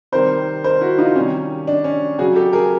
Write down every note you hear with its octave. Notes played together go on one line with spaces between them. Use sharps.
C3 D#3 G3 A#4 C5
A#4 C5
E4 F#4
D#4 F4
C3 D#3 G3 C#4
D4
C#4
C#3 F#3 F#4 G#4
G4 A4
G#4 A#4